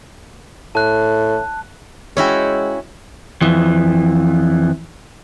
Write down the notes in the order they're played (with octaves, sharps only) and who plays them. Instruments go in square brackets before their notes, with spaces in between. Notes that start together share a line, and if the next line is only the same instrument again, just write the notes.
[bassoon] A2 [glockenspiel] A5 F#6
[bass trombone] G#3 [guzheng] C#4 E4 F#4 [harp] C#5 G5
[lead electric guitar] F2 E3